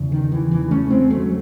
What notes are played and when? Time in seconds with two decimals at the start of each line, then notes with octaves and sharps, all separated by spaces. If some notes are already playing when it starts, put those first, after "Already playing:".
Already playing: E2 C#3
0.12 D#3
0.32 E3
0.51 E3
0.71 A3 C#4
0.90 G#3 C4
1.10 F#3 A3